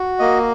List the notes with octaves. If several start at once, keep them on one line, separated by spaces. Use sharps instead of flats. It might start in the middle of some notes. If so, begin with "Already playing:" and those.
Already playing: F#4
A#3 D#5